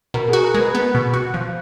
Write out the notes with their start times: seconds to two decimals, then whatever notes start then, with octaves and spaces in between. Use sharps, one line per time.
0.14 B2 A#4
0.28 G#4
0.33 F#4
0.43 A#4
0.54 G#3 B4
0.75 B3
0.95 B2
1.14 F#4
1.34 F3